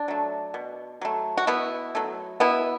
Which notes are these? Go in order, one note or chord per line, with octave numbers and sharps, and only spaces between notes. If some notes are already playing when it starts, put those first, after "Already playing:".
Already playing: D4
F#3 A3
B2
F#3 A3
F#4
B2 B3 E4
F#3 A3
B2 B3 E4